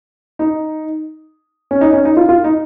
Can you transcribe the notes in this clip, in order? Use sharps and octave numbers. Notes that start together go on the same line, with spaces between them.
D#4
C#4
D#4
C#4
D#4
F4
F4
D#4